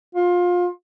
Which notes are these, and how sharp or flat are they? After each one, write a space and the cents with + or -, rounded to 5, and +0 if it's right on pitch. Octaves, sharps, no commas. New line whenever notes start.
F4 +25